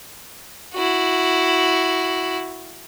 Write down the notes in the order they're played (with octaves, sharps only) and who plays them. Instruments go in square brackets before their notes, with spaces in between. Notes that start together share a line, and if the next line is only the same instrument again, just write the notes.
[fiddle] E4 F#4